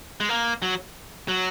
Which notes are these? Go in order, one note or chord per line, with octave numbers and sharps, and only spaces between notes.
G#3
A#3
F#3
F#3